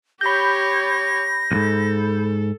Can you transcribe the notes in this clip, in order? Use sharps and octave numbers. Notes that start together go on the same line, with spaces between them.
G4 C#5 B5 G6 A#6
C2 G#2 A4